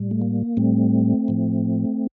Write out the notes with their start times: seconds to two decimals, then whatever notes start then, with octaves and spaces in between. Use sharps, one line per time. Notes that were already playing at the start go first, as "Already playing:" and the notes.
Already playing: A2 G3
0.11 A3
0.22 A#3
0.57 A2 G3 A3 C4
1.28 A2 F3